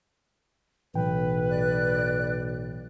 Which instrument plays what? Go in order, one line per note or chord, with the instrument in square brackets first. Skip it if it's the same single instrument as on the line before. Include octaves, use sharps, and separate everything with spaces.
[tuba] B1 [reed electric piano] A2 E3 G5 [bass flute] B4
[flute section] D5 F#6